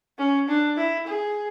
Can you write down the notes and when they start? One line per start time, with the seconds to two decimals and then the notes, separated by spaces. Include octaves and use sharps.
0.18 C#4
0.48 D4
0.77 E4
1.06 G#4